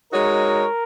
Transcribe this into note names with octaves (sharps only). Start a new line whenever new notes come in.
G#3 D#4 F#4 A#4 C#5